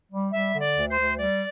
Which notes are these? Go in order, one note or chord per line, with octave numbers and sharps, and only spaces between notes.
G3
G3 E5
D3
D5
D2
C5
D2
G3 D5